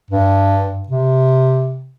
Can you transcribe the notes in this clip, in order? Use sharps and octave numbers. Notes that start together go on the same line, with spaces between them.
G2
C3